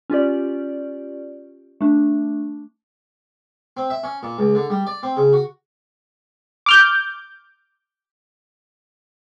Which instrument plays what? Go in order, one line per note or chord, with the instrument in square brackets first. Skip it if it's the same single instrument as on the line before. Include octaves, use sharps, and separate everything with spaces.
[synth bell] C#4 F4 G4 D5
A3 D4
[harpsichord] C4
E5
C#4
A#2
C#2
D3
G3
D5
C4
C#3
F#4
[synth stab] D6 F6 G6